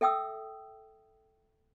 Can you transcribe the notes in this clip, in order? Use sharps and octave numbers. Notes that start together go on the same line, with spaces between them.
A4 E5 G5 D#6 E6